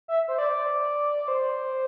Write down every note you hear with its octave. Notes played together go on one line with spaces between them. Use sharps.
E5
C5
D5
C5